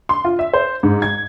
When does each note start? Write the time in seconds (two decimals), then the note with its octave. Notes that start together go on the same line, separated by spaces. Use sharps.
0.09 C6
0.25 F4
0.39 E5
0.53 C5
0.83 G#2
1.02 G#6